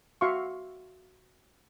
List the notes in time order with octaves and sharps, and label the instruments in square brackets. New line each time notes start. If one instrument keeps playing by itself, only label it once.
[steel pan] F#4 E5 F5 C6 C#6